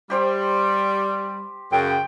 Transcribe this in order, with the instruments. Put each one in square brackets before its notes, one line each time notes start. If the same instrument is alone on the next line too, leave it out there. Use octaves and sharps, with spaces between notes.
[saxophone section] G3 [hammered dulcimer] G4 C5 G5
[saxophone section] F#2 C#3 [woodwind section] G5